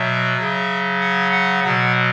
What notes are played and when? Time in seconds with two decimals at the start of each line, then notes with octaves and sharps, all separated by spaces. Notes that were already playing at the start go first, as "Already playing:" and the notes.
Already playing: B2 F#3 E5
0.37 C#3 F#3
1.01 F#5
1.32 F#5
1.64 B2 F#3 F#5